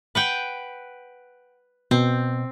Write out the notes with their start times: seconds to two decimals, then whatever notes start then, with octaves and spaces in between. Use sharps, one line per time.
0.15 B4 F#5 G5
1.91 B2 C4